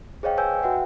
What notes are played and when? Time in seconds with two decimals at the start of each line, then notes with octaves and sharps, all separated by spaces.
0.23 G#4 C5 C#5 D#5 F5 G5
0.37 B4 C#5 D#5 G#5 E6 G6
0.62 F#4 B4 E5 F#5 G5